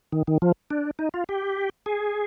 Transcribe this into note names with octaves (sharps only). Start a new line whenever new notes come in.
D#3
D#3
F3
D4
D#4
F4
G4
G#4